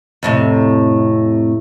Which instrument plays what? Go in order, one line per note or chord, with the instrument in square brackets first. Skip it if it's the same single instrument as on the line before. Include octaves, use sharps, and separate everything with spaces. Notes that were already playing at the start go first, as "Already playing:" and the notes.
[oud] F2 A2 C3